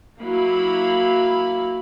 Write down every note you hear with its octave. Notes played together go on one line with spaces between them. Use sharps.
F#3 A#3 E4 F5 B5